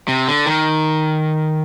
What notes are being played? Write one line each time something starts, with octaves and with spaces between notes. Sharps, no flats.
C3
D3
D#3